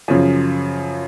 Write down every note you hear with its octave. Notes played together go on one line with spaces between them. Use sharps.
F#2 C#3 F3